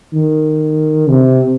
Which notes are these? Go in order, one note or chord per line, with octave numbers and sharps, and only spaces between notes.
D#3
C3